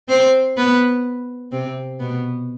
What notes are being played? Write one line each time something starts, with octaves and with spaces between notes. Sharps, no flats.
C4 C5
B3 B4
C3 C4
B2 B3